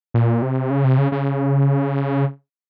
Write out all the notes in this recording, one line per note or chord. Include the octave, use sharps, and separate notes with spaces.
A#2
C3
C#3
C3
C#3
C#3